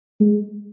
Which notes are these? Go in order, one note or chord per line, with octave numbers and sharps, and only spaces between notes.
G#3